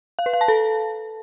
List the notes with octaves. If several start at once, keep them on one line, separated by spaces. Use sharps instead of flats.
F5
B4
F5
A5
A4